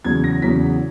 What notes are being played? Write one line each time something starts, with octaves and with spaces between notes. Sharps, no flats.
E2 C#3 F#3 G#6
A#6
E2 C#3 F#3 B6